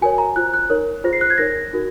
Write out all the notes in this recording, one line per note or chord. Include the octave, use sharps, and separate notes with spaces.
F#4 A#4 C#5 G#5
A#5
F4 C5 F#6
F#6
D#4 A#4 C#5
F4 G#4 C5 A#6
C7
F#6
G#6
D#4 A#4 C#5 A#6
D#4 F#4 A#4